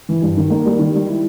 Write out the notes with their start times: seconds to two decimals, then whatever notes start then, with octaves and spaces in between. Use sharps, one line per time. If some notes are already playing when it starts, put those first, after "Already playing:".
0.09 E3
0.22 G2
0.37 D#3
0.50 A#3
0.65 G3
0.79 D#3
0.94 G3
1.07 E4